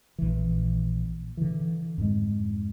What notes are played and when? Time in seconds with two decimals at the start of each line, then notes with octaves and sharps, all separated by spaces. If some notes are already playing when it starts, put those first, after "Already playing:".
0.18 A#1 E3
1.37 D3 E3
1.98 F2 G#2 G#3